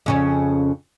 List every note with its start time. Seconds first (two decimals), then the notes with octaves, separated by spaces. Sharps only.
0.06 F2 C#3 C#4